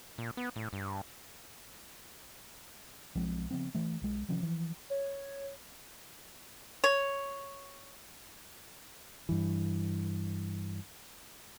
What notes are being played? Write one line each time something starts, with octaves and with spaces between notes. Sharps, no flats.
A#2
B3
A2
G2
B1 F3 G#3 C4
C#3 F3 B3 C4
E3 A3
B1 G#3
C3 D#3 F3 C#4
E3 F3
C#5
C#5
G2 E3